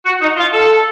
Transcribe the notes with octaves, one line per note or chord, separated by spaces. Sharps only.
F#4
D#4
F4
A4